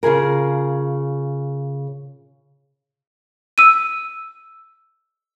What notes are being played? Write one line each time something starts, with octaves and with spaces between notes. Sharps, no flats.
C#3 F4 G#4 A#4
E6 D#7